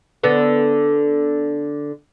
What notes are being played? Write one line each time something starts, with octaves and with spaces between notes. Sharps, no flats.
D3 B3